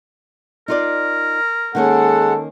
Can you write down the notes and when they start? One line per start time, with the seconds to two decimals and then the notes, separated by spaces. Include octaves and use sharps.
0.68 D#4 F4 A#4 D5
1.75 D#3 G#3 A#3 C#4 A4 F#5